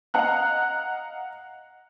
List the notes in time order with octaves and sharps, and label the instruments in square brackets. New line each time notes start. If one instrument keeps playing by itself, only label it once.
[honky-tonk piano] D#5 F5 F#5 A#5 F#6